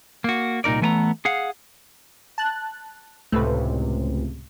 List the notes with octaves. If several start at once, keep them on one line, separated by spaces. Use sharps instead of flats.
A#3 F#4
C2 A#2 D#4 A#4 D5
E3 A3 B3 G#5 A#5
G#4 F5 F#5
A5 F#6
C#2 A2 C3 A3 B4